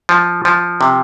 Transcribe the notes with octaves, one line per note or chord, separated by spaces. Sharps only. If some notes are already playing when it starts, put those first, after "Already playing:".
F3
F3
C3